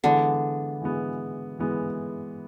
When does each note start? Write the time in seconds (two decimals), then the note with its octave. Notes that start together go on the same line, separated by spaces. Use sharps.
0.04 D3 E3 G#3 B3
0.81 E3 G#3 B3
1.59 E3 G#3 B3